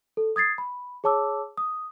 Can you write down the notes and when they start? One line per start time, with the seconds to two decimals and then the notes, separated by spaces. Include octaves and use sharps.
0.17 A4
0.36 D#6 G#6 A6 C7
0.58 B5
1.04 G#4 C#5 A5 D6 E6
1.57 D#6